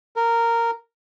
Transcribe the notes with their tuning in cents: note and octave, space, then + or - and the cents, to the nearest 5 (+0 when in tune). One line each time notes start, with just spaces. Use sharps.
A#4 -10